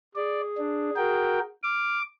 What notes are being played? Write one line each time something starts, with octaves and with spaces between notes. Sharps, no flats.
G#4 D5
D4
F#4 A#4 G5
D6 F6